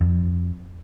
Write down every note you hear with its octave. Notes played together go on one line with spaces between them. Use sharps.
F2